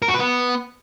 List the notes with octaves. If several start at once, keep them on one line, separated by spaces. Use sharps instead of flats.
A#4
F#4
B4
B3